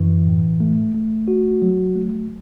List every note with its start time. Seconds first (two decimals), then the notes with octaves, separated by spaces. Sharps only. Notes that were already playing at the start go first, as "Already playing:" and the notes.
Already playing: F#2 E3
0.27 A2
0.60 A3
0.95 A3
1.28 F#4
1.62 F#3
1.96 A3